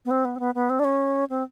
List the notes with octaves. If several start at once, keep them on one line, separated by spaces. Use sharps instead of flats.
B3
C4
B3
C4
B3
B3
C4
D4
C#4
C4